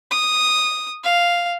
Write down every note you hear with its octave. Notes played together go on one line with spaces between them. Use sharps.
D#6
F5